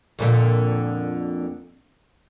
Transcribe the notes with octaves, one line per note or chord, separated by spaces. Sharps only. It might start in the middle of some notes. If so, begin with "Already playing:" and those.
F2 A#2 D3